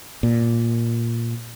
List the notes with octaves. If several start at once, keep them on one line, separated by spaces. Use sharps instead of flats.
A#2